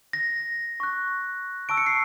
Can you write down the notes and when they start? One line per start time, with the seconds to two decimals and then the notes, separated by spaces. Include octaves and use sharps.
0.13 A#6
0.80 C#6 F#6
1.69 A5 C#6 E6 D7
1.77 C#7
1.86 C7